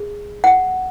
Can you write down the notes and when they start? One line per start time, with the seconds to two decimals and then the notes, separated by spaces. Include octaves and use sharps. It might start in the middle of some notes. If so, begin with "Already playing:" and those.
Already playing: G#4
0.44 F#5